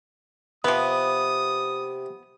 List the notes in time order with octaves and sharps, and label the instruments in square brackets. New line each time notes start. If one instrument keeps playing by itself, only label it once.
[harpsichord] C3 D6 [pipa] F3 B3 [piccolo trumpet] D#6